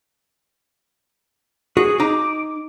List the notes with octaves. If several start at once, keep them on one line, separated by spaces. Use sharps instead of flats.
F#4 G#4
D#4 A#5 D6